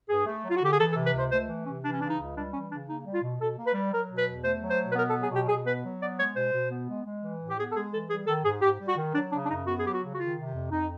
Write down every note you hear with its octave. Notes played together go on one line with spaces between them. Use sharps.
G2 G#4
A3
F#3
F4
F#4
D3 G4
G#4
E3 A4
A4
C3
B4
C#2 C5
A3 C5
E3
C3 C#4
E3 D4
C#4
C#3 D4
D#4
C#2
G3 D4
E3 C#4
C#3 D4
A#3 D#4
G3
F4
B2
B2 A4
A#3
B4
G3
F#3 A#4
B2
B4
E2
A3 C5
F#3
C5
B2
B4
B3 A#4
A4
F#3
G#4
B2 G4
B2 G#4
B3 B4
F#3
B3 D5
G#3 C#5
B2 C5
B2
B3
G#3
G#3
E3
A2
G4
B3 G#4
A4
G#3 G#4
E3 A4
G3 G#4
D#3 A4
G#2 G#4
G#2 G4
G3
F#4
D#3
F#3 D4
C#3 D4
D4
F#2 D#4
B3 F#4
G#4
F#3 G4
F#4
C#3
F#4
D#3 F4
C3
F2
F2 D#4